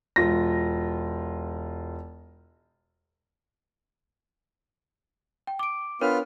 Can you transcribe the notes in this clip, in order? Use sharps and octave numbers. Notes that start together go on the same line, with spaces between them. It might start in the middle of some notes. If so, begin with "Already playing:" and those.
E1 F4 A#6
G5
D6 D7
B3 D4 F4 A#4 C#5 F6